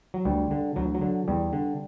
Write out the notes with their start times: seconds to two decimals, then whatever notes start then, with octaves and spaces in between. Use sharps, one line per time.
0.14 F#3
0.25 D2 G3
0.51 D3
0.76 D2 F#3
0.95 F#3
1.01 D3
1.28 E2 G3
1.53 D3